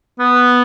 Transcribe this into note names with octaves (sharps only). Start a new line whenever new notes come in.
B3